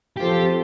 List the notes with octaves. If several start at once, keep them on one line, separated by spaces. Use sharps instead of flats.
F3 C4 F4 G4 A4 C5